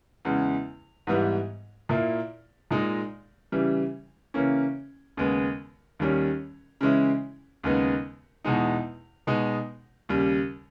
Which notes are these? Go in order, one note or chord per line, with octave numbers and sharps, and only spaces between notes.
E2 C#3 G#3
G#2 E3 G3 B3
A#2 A#3 E4
A#2 G#3 D#4
C#3 E3 G3
C#3 E3 A#3 C#4
D#2 C#3 G#3 B3
D#2 D#3 G3 C#4
C#3 E3 G#3 C#4 E4
D#2 C#3 G#3 B3 D#4
E2 B2 G#3 D#4
B2 G#3 D#4
D#2 C#3 G3